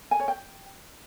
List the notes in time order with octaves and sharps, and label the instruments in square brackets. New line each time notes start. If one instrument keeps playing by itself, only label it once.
[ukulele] G#5
C#5
G5